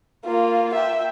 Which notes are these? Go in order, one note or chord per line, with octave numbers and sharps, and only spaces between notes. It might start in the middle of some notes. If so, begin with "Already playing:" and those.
A#3 F4
E5 G5